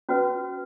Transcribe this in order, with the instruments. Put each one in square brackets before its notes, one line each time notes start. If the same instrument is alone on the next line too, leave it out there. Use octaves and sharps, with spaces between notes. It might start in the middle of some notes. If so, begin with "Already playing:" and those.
[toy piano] C#4 F#4 B4